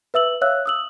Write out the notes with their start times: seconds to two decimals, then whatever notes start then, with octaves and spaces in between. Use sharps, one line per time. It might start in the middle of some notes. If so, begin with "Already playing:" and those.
0.14 B4 E5 E6 F#7
0.41 C#5 E5 F5 E6 F#6
0.66 D#6 E6 F#7